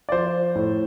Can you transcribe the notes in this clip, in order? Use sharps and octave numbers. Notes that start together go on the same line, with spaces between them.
D5
F3 C5
A2